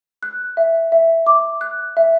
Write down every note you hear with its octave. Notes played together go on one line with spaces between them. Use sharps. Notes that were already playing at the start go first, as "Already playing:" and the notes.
F#6
E5
E5
D6
F#6
E5